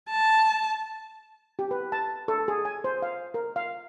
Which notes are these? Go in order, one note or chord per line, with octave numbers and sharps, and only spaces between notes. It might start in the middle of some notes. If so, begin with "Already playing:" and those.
A5
G4
B4
A5
A4
G#4
G#5
C5
F5
A#4
F5